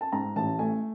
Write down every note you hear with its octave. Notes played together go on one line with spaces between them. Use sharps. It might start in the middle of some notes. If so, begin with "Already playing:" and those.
A5
G#2 A#5
A1 A5
A3 G#5